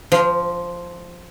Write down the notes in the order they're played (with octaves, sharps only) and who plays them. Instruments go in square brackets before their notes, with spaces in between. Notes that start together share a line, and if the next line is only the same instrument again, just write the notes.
[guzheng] F3